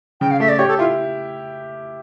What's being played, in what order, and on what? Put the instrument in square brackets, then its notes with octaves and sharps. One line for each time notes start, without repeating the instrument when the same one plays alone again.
[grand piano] C#3 [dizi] G5
[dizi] F5
[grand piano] A3 [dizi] E5
[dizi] D5
[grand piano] G4 [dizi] C#5
[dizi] A4
[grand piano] E4 [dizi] F4